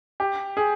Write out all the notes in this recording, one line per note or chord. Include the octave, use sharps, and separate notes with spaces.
G4
G#4